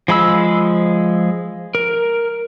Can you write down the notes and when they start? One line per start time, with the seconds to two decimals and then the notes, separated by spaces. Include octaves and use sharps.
0.08 F3 G#3 B5 E6
1.75 A#4